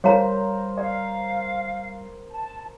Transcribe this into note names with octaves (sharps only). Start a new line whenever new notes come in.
G3 A#4 C5 C#5 F5 A#5
D5 F5
A5